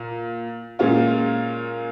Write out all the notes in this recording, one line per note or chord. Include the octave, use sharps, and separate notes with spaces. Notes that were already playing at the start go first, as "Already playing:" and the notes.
Already playing: A#2
A#2 G#3 C#4 F4